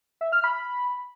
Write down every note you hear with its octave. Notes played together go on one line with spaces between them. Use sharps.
E5
F6
B5